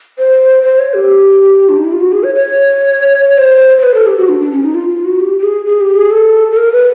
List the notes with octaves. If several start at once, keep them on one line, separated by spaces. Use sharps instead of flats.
C5
C5
C#5
G4
D4
D#4
E4
F4
F#4
G#4
C#5
C#5
C5
C5
B4
A4
G4
F#4
D4
D4
C#4
D#4
F4
F4
F#4
G4
G4
G#4
G#4
G4
G#4
A4
A4
A#4
B4